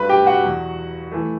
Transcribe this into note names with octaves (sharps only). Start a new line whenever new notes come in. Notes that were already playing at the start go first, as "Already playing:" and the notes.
Already playing: G2 F#3 A3 B4 B5
G4 G5
F#4 F#5
E2 B2 F#3
E3 A3